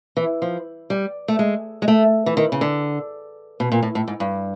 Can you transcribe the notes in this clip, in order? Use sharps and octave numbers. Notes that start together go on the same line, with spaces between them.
E3
F3
G3
A3
G#3
G#3
A3
E3
D#3
C#3
D3
B2
A#2
A2
A2
G#2
G2